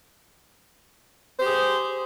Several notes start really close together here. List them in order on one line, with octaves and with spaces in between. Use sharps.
C5 G4 G#4